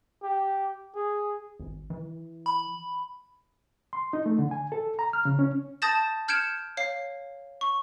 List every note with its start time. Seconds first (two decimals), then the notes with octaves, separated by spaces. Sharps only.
0.23 G4
0.95 G#4
1.59 G#1
1.90 E3
2.46 B5
3.93 C6
4.13 D#4
4.26 A3
4.39 D3
4.51 G#5
4.72 A4
4.99 A#5
5.13 F6
5.25 C#3
5.39 C#4
5.82 A5 D#6 G6 A6 A#6 E7
6.28 F6 G6 G#6 C#7 D7 E7
6.77 C#5 F5 C7
7.61 C#6